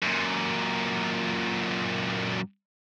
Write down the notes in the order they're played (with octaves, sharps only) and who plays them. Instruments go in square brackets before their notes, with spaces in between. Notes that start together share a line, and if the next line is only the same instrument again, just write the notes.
[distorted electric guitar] F#2 A#2